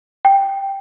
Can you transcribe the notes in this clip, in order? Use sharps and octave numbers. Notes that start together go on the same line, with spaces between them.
G5